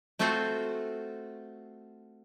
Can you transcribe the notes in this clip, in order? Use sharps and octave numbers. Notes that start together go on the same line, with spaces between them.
A3 C4 F4 F#4 A4 C5